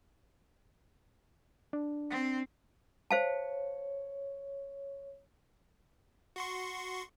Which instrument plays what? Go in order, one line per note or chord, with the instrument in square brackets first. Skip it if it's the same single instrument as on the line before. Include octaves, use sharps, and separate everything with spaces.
[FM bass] D4
[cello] C4
[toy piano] C5 F5 A5 [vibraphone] C#5
[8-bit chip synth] F#4 C6 C#6